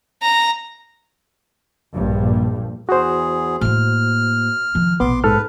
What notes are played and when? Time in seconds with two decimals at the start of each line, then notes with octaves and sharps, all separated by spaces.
0.22 A#5
1.93 A#1 G2
2.89 E2 F#4 G#4 C5
3.61 A2 A#3 F6
4.75 D#3 F3
5.00 A#1 B2 B3 C6 D6
5.24 G#2 A4 B4 F6